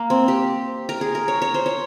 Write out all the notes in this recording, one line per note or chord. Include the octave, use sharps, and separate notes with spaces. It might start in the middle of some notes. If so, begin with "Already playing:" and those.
Already playing: A#3
C4
G4
A#4
G#4
A#4
C#5
C#5
C5
C#5